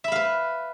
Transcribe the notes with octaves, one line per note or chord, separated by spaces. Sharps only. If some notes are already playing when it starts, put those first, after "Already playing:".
B4 E5 F5 B5